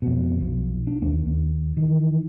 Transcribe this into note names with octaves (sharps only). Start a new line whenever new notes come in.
F2 B2
B1 F3
D4
D#2 A#3
D#2
D#3 E3